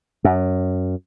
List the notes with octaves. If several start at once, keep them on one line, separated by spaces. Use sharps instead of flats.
F#2